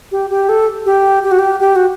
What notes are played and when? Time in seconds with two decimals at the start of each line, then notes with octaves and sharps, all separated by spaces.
0.12 G4
0.30 G4
0.49 A4
0.86 G4
1.23 G4
1.31 F#4
1.39 G4
1.60 G4
1.76 F#4